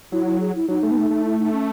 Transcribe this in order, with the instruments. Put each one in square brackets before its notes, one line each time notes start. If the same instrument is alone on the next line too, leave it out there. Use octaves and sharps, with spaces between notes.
[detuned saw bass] F#3 [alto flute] E4
[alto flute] E4
G#4
E4
[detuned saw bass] F#3 [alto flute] D#4
[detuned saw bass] A3
B3
A3
A3
[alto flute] E4
D#4
C#4